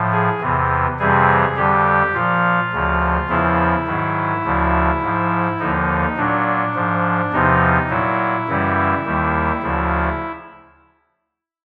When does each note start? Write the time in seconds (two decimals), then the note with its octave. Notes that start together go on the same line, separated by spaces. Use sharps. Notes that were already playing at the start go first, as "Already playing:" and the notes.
Already playing: A2 F3
0.12 G#4
0.41 E2 C3 E3
0.99 F2 C3 E3 G3 G#4
1.56 F2 D3 G3 G4
2.14 A#2 F3 F4
2.72 D2 C#3 F3
3.29 E2 C#3 F3 E4
3.87 G#2 D#3 F#3
4.45 D2 C#3 F3
5.02 G#2 F3
5.60 D#2 D3 F3 D#4
6.17 A#2 F#3 D4
6.75 G#2 F3
7.33 E2 C3 F3 D#4
7.90 A#2 F#3 E4
8.48 F#2 C#3 E3 G3
9.06 D#2 D#3 G3
9.63 D2 C#3 F3